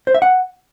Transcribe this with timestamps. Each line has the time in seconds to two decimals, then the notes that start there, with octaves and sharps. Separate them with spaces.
0.07 C5
0.14 E5
0.22 F#5